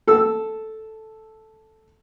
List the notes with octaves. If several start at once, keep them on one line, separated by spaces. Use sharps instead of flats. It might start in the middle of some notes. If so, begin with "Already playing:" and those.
A4 E6